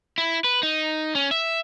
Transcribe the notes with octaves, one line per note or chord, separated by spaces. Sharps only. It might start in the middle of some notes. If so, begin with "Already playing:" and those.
E4
B4
D#4
C#4
E5